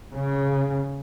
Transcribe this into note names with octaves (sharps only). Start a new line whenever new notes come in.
C#3